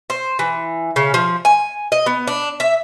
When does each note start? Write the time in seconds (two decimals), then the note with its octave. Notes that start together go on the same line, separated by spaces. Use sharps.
0.10 C5
0.39 E3
0.96 C#3
1.14 F3
1.45 G#5
1.92 D#5
2.06 B3
2.27 D4
2.60 E5